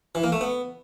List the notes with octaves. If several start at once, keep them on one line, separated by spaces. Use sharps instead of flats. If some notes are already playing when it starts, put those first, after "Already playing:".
E3
A#3
A3
B3